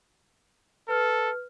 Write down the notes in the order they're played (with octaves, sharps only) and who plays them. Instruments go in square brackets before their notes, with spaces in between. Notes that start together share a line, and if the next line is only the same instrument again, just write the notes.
[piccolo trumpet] A4 [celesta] B4 F6